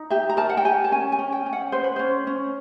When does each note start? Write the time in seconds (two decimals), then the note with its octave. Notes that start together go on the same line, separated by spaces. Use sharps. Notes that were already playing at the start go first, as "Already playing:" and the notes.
Already playing: D#4
0.10 G4 E5
0.29 A#5
0.37 A#4 A5
0.49 F#5
0.57 G5
0.65 G4 G#5
0.84 A5
0.92 C#4 G#5
1.12 G#5
1.19 C#4
1.32 G5
1.46 C#4
1.53 F#5
1.72 B4 C5
1.84 B4
1.96 C#4 C5
2.27 C#4